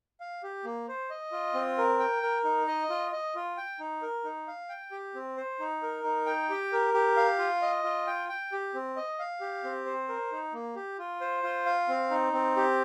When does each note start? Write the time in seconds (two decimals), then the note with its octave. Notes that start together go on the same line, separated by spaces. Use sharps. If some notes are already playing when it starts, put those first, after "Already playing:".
0.20 F5
0.43 G4
0.65 A#3
0.88 C5
1.10 D#5
1.32 F4
1.54 C4
1.78 A#4
2.00 G5
2.23 A#4
2.44 D#4
2.67 D#5
2.90 F4
3.12 D#5
3.35 F4
3.57 G5
3.80 D#4
4.02 A#4
4.24 D#4
4.48 F5
4.69 G5
4.91 G4
5.15 C4
5.37 C5
5.60 D#4
5.82 A#4
6.04 D#4
6.26 G5
6.50 G4
6.72 A#4
6.94 G4
7.17 F5
7.39 F4
7.62 D#5
7.84 F4
8.07 G5
8.29 G5
8.52 G4
8.74 C4
8.96 D#5
9.19 F5
9.41 G4
9.64 C4
9.86 C5
10.09 A#4
10.32 D#4
10.53 A#3
10.76 G4
10.99 F4
11.21 C5
11.43 F4
11.66 F5
11.88 C4
12.11 D#4
12.33 C4
12.56 G4